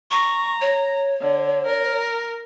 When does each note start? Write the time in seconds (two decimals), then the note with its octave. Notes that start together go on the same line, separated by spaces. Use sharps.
0.11 A#5 C#6
0.61 C#5
1.20 D3
1.66 A#4